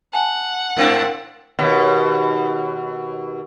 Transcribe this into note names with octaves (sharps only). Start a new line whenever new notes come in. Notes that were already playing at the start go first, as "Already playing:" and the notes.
F#5 G#5 A5
G#2 C4 D4 A#4 F5 G5
D#2 B2